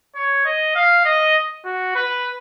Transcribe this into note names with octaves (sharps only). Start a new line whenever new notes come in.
C#5
D#5
F5
D#5
F#4
B4